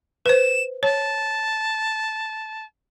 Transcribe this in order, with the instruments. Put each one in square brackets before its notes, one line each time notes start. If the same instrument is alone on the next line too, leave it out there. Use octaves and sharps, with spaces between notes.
[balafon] B4 C5 [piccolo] E7
[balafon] C#5 [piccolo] A5